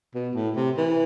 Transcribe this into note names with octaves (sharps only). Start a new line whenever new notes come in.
B2
A2
C3
E3